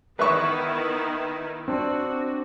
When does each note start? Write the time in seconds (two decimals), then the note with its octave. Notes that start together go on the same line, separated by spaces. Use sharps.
0.19 D#3 B3 E4 B4 E5 C#6
1.68 C4 D4 F#4